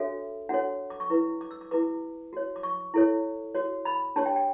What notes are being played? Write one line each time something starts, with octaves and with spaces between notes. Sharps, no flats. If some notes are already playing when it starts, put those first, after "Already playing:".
Already playing: D4 F#4 A4 C#5 E5
D4 F#4 A4 C#5 F#5
D6
C#6
E4 B4
D6
E6
D6
E4 G4 B4 D6
F#4 C#5
D6
C#6
E4 A4 C#5
F#4 C#5
B5
D4 G4 C#5 A5
G5
G5